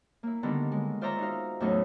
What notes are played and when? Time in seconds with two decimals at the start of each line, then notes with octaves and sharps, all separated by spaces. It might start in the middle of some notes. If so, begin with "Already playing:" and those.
0.23 A#3 E4
0.43 D3 D#3 G3 B3
0.72 G#3
1.01 F4 C5 D5 E5 A#5 C#6
1.19 D#4 F#4 F5
1.60 E2 A2 F#3 A3 C#4 D#4